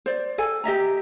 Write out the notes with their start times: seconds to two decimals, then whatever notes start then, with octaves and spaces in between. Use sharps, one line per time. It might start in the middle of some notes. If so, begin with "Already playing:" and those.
0.06 C5 D5
0.38 A4 G#5
0.64 G4 D#5 E5 A#5